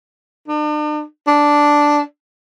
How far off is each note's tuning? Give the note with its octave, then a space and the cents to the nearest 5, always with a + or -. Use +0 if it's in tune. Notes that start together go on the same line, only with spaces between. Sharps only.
D4 +45
D4 -5